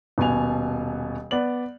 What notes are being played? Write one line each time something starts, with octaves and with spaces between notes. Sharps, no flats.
D#1 B2 B3 G#5 F7
B3 D5 F#7